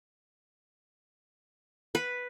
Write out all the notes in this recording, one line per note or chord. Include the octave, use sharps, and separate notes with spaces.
B4